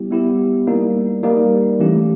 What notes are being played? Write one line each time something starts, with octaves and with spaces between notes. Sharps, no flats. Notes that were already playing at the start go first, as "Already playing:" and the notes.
Already playing: G3 B3 E4 G4
G3 B3 E4 G4
G3 A#3 D#4
G3 A#3 D#4
E3 A3 C#4 E4 G4